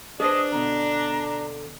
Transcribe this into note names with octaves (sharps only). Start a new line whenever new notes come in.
D4 G#4 B4 C5 D#5
B2 D3 A#5